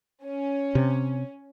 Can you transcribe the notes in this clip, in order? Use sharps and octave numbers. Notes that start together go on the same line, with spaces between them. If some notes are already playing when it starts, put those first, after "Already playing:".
C#4
C3